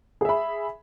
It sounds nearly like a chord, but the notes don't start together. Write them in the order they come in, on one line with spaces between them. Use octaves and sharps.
G#4 E5 B5